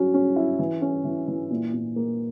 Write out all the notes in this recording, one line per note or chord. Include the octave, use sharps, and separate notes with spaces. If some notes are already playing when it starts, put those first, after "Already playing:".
Already playing: F#3 C#4
C#4
E4
E3
C#4
E3
E3
A#2
A#2
A#3